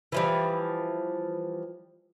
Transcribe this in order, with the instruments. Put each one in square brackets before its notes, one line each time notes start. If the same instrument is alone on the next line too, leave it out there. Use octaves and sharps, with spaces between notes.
[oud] E3 F3 G3